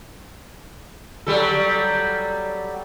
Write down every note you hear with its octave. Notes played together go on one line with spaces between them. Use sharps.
F#3 G3 A4